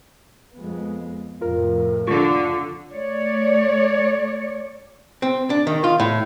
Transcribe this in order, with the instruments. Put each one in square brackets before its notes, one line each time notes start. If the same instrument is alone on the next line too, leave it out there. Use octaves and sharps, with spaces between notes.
[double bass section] F2 G#3 B3
[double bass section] F2 A2 C3 [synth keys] F4 A#4
[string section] D3 [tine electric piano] F4 [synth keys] C#6 D6
[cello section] A3 C#5 D5
[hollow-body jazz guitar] C4
D4
D#3
F4
A2